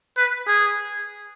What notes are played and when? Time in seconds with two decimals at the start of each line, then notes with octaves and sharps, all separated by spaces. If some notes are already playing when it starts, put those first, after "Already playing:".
0.17 B4
0.47 G#4